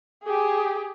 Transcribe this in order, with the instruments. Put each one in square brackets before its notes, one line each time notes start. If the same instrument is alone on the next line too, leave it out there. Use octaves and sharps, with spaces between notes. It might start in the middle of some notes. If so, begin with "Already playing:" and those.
[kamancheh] G4 G#4